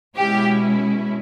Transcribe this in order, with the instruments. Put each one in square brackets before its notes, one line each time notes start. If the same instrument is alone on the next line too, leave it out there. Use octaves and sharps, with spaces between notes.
[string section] B2 G#3 C#4 E4 G4